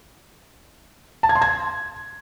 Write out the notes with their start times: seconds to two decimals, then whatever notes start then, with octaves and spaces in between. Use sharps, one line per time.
1.23 A5
1.29 G#6
1.35 C6
1.42 G#6